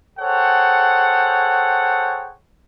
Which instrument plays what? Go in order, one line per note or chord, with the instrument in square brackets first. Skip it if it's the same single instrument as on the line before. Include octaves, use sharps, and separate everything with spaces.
[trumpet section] G#4 A4 C5 C#5 F#5 G5